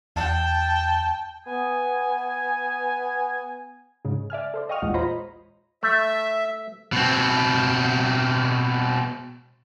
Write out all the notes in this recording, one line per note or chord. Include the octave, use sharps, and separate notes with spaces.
E2 G5 A5
B3 G#5
G#2 C#3
D5 E5 G#5 F6
A4 C5 D5
D#5 F5 G5 C#6 D#6 F6
A#1 E2 A#2 G#3 F#5
F4 C5 C#5 D#5 A#5 B5
A3 E5
B2 C4